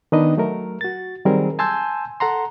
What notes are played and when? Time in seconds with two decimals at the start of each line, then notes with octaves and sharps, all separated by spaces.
0.12 D#3 B3 D4 D#4 B4 D#5
0.37 F#3 A3 A#4
0.81 F#4 A6
1.25 D#3 F#3 G3 C4 G#4 A#4
1.59 G#5 A5 C6 E6 G6 G#6
2.20 A4 F#5 A#5 C6